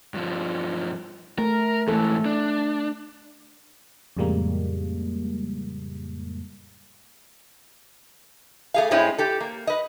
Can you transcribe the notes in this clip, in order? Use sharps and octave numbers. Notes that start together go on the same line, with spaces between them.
G2 F3
A3 A#4
G#2 E3 A3 A4
D4
F2 A2 C#3 G3 G#3 A#3
A3 G#4 F5
A2 G#3 C4 C#4 E4
G4 A4
A#3
B4 D#5